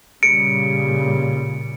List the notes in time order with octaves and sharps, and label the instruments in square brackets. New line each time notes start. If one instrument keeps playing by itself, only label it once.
[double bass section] A#2 C#3 G3 [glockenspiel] C#7 D7